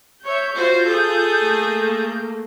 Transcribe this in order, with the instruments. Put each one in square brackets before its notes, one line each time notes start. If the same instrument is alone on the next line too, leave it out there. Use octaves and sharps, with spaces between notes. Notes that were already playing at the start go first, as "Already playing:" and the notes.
[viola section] C#5 E5 [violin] G6
[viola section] F4 [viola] F#4 C5
[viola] G#4 A4
[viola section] A3 A#3